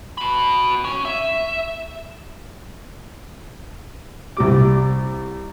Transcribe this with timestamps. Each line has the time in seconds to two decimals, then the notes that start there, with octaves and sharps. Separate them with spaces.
0.18 F#4 B5
0.85 C#4
1.05 E5
4.37 C2 G3 D6